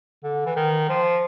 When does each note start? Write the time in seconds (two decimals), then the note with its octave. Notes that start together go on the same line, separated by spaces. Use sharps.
0.24 D3
0.46 E3
0.56 D#3
0.89 F3